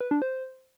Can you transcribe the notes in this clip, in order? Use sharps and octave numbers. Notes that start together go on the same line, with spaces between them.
B4
D4
C5